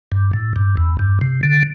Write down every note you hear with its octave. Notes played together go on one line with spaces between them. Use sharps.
G2
A2
G2
E2
G2
C3
D3